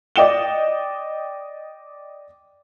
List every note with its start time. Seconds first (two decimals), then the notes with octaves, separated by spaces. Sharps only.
0.16 D5 D#5 G5 E7 G7